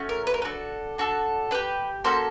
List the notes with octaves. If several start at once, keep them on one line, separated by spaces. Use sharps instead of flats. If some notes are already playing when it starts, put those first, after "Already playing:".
Already playing: A3 C#4 F#4
A#4
B4
A#4
B4
D4 F#4 A4
D4 F#4 A4
D4 G4 B4
A#3 C#4 F#4 A4 C5